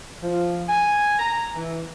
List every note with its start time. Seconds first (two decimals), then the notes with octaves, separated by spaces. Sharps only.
0.22 F3
0.68 G#5
1.19 A#5
1.55 E3